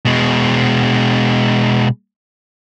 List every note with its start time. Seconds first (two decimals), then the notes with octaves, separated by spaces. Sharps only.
0.05 B2 G#3